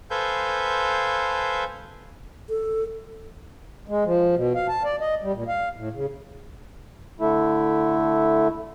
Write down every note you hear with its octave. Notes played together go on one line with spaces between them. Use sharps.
A4 B4 C5 F5 G#5 G6
A4
G#3
F3
B2
F5
A5
D5
D#5
G3
A#2
F5
A2
C#3
D3 A3 E4